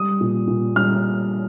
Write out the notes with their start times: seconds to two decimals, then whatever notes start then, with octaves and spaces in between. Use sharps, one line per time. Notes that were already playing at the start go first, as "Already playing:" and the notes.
Already playing: G3 D#6
0.21 A#2
0.47 A#2
0.75 G3 F6